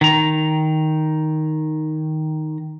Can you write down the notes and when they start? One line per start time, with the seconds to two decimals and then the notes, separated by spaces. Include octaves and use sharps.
0.01 D#3 A#5